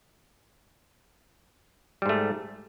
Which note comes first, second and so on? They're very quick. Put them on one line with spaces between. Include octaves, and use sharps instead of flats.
G3 G#2 A3